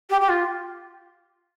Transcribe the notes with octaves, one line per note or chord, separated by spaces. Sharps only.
G4
G4
F4